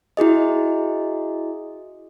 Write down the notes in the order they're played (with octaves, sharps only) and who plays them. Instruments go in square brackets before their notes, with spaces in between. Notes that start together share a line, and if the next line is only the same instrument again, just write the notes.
[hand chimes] E4 F#4 G#4 D#5